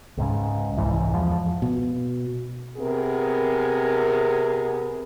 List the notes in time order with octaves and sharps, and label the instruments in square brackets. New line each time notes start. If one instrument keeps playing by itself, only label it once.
[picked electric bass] C#2 G#2 C#3
F#1 C2 G#2 E3
E2 F3
[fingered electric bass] B2
[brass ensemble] C3 B3 G#4 A#4